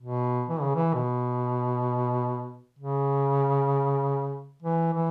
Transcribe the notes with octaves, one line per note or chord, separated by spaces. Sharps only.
B2
E3
C#3
E3
B2
C#3
E3
E3